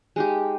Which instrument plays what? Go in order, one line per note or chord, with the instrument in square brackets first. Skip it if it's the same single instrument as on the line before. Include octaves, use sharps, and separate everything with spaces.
[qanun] G#3 D#4 G4